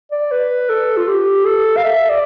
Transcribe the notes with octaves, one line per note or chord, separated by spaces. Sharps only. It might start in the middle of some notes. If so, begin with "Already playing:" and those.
D5
B4
A4
F4
G4
A4
F5
E5
D5